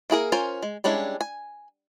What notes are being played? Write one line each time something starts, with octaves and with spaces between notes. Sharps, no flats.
A#3 E4 G#4 A#4
C#4 F4 A#4 C5 G#5
G#3
G3 G#3 C#4 D4 E4
G#5